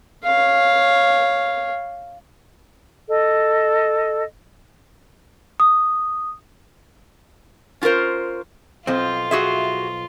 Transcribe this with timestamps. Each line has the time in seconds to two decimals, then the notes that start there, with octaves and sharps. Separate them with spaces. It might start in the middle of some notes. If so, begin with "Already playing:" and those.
0.24 C#5 F5
3.09 A4 D#5
5.60 D#6
7.82 C#4 F4 A4 A#4 C5
8.87 B1 F3 C4 F4
9.31 F#4 G#4 E5